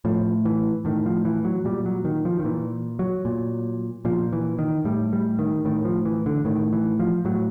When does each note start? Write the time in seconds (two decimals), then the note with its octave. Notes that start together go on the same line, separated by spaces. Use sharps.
0.05 A2 F3
0.45 E3
0.85 A2 D#3
1.06 F3
1.25 E3
1.45 F#3
1.65 A#2 G3
1.86 F#3
2.05 D#3
2.25 F3
2.39 D#3
2.44 A#2 E3
2.99 F#3
3.25 A#2
4.05 A#2 F3
4.33 E3
4.59 D#3
4.85 A2 G3
5.13 G3
5.39 D#3
5.65 A2 D#3
5.85 F3
6.05 E3
6.26 D3
6.45 A2 D#3
6.73 E3
6.99 F3
7.25 A2 F#3